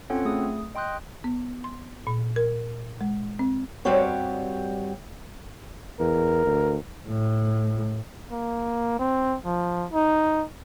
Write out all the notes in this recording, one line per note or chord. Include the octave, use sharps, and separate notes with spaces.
C4 C#4 F4 A4 C#5 F#5
A3 G#4 D#6
D#5 G5 C6 D#6 F#6 G6
B3
C6
A#2
A#4
G#3
C4
G2 G3 C4 F#4 G4 C#5
E2 A#4
D2
A2
A#3
C4
F3
D#4